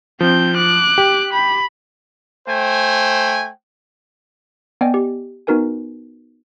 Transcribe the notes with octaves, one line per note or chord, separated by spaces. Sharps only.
F3 C4 G6
D6 F#6
G4
B5
A3 C5 G5 G#5
B3 D5 D#5 G5 G#5
G4
B3 D#4 F#4 A#4 B4 G#5